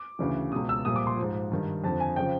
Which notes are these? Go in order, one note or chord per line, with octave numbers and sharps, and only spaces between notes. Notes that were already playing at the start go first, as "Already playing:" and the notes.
Already playing: D6
D2 C#3 E3
C#2 B2 D#6
E6
C2 A#2 F3 D#6
D6
C6
F3
G#2
G2 D#3
F2 D3 F3 A5
G#5
C#3 F3 G5